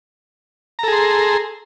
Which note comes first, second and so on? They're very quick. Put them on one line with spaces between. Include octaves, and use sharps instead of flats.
A#5 A4 G#4 C6